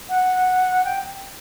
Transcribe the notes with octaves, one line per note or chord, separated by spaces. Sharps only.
F#5
G5